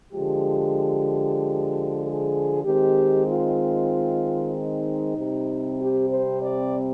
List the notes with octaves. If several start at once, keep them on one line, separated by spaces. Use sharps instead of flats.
D3 F3 G#3 G4
G#4
D#3 G#3 C4 G4
F4
D#4
C3 G3 C4
G4
C5
D5